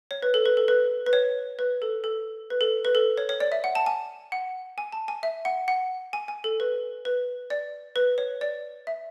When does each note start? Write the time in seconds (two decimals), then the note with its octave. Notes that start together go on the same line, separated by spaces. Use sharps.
0.11 C#5
0.22 B4
0.34 A4
0.46 B4
0.57 A4
0.68 B4
1.06 B4
1.13 C#5
1.59 B4
1.82 A4
2.04 A4
2.50 B4
2.61 A4
2.85 B4
2.95 A4
3.18 C#5
3.29 C#5
3.40 D5
3.52 E5
3.64 F#5
3.75 A5
3.86 G#5
4.32 F#5
4.78 G#5
4.92 A5
5.08 G#5
5.23 E5
5.45 F#5
5.68 F#5
6.13 G#5
6.28 G#5
6.44 A4
6.60 B4
7.05 B4
7.50 D5
7.96 B4
8.18 C#5
8.41 D5
8.87 E5